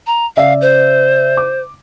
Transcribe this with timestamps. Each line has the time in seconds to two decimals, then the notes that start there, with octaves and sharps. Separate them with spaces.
0.07 A#5
0.36 C#3 D5 E5 F5
0.61 C5
1.37 D6